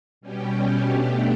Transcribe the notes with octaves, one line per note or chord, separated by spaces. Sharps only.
B2 G3 C#4 G4
B2 A3 D4 G4